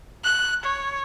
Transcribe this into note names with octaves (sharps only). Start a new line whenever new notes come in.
F#6
C#5